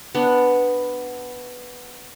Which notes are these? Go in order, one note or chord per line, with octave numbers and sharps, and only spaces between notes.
B3 D4